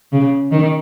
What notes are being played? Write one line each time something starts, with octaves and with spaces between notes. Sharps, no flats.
C#3
D#3